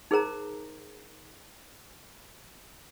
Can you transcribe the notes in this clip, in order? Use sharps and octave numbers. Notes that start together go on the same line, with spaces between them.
D#4 G#4 A#4 C5 A#5